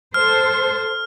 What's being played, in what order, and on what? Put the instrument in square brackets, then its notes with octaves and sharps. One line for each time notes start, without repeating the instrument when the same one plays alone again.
[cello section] A4 C5 [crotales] F6